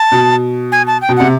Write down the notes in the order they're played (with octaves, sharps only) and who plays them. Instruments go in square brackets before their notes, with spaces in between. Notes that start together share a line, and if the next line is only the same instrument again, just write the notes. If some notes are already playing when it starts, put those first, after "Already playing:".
Already playing: [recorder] A5
[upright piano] B2
[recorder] G#5
A5
G5
[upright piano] B2
[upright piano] C3 [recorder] F#5